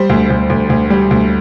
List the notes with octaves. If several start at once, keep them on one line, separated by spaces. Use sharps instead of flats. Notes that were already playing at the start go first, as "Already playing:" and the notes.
Already playing: G3 C5
D2
D2
D2
D2
G3
D2